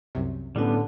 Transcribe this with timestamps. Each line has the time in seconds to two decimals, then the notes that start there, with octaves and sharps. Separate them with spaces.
0.15 C2 F#2 C3
0.56 A2 D3 G3 B3 C#4